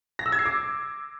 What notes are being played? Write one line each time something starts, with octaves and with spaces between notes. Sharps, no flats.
A#6
E6
G#6
C7
D6